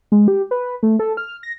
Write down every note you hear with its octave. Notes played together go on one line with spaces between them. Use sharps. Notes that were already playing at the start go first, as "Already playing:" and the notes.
G#3
G4
B4
A3
A4
F6
A#6